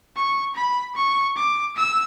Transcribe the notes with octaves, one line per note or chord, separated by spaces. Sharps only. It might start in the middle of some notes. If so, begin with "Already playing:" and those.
C#6
B5
C#6
D6
E6